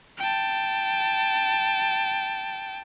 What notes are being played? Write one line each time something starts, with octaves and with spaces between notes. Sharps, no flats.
G5 A5